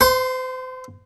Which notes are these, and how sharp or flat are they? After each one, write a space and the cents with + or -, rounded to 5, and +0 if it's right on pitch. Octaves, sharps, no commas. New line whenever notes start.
C5 -35 C6 +0